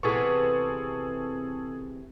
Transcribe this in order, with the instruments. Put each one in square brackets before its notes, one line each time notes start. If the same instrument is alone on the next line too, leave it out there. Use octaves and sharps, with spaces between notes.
[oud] C3 E3 B3 [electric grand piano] G#4 A4 C#6